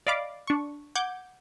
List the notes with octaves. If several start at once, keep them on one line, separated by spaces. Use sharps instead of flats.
D5 D#5 F5 B5 D6
D4 C#6
F#5 D6 G6 G#6